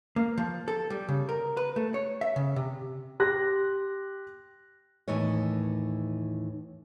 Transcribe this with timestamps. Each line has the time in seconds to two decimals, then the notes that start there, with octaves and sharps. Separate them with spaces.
0.16 A#3
0.38 F3
0.68 A4
0.90 G3
1.08 C#3
1.29 A#4
1.57 B4
1.76 A3
1.94 C#5
2.21 E5
2.36 C#3
2.56 C3
3.20 G4 C6 F#6 A#6
5.08 D#2 A2 E3 D#4 C#5